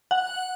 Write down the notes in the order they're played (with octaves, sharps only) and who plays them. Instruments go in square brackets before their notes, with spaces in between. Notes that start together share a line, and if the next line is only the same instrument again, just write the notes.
[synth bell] F#5